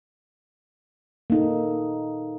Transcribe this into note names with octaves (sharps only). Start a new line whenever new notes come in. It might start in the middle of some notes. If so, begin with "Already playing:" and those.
A#3 D#4 A4